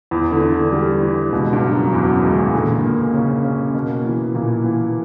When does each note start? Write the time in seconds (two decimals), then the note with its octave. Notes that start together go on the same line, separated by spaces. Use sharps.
0.11 E2 E3
0.31 D3
0.41 D4
0.52 D3
0.72 D3 G3
1.02 E3
1.32 C#2 B2
1.53 G2
1.62 F#3
1.73 F#2
1.92 E2 F#3
2.13 F#2
2.23 C#2
2.33 E3
2.54 A#2 D3
2.84 A#3
3.14 C#3 C#4
3.45 C#4
3.74 B2 A#3
4.04 E3
4.35 A#2 E3
4.64 E3